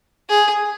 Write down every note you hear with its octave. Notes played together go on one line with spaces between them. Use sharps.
G#4